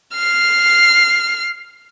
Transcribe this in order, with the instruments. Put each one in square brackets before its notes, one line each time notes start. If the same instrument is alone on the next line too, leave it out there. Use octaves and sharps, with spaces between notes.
[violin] F6 C7